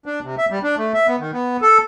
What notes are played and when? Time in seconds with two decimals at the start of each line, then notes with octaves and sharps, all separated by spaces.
0.06 D4
0.23 C3
0.38 E5
0.50 G3
0.63 D4
0.78 A3
0.94 E5
1.08 B3
1.19 D#3
1.33 B3
1.62 A4